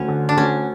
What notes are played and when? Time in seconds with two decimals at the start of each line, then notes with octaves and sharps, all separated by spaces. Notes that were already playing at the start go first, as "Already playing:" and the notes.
Already playing: D2 C#4
0.08 D3
0.29 D4
0.37 D2 C#4